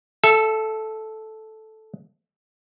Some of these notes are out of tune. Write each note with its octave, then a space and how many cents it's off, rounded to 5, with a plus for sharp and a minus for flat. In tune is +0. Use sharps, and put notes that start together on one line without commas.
A4 -10 E5 +20